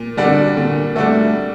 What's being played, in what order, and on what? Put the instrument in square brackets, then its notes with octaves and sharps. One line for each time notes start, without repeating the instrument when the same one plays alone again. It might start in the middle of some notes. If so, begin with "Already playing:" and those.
Already playing: [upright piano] A#2
[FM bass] D3 [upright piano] G3 D4 F#4 A4
[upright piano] A#2 [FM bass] D3
[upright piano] G3 D4 F#4 A4 [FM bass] A3